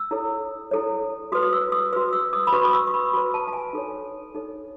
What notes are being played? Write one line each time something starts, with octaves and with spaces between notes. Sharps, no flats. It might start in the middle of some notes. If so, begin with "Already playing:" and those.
Already playing: E6
E4 A4 C#5
E4 A4 C#5
F#4 B4 D#6
D#6
E6
D#6
F#4 B4 E6
E6
D#6
B5
F#4 B4 C#6
D#6
E6
C#6
B5
F#4 B4 B5
A5
A5
G#5
D#4 A4 C#5
D#4 A4 C#5